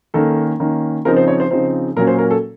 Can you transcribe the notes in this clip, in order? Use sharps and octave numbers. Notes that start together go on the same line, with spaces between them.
D#3 A#3 C#4 A4
D#3 A#3 C#4
C#3 F3 C4 D#4 A#4
C5
C#5
C5
C#3 F3 C4 D#4 C5
A#2 F#3 A#3 C#4 A#4
C5
A#4
A4